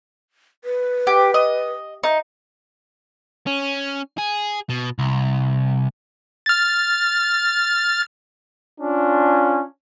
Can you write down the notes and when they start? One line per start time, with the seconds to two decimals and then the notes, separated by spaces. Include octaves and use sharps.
0.64 B4
1.07 G4
1.34 D#5
2.03 D#4
3.47 C#4
4.18 G#4
4.69 B2
4.99 C2
6.46 F6 A6
8.80 C#4 D4 F4